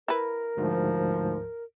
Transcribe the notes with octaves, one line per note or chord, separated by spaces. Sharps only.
E4 A#4 B4
D2 G#2 F3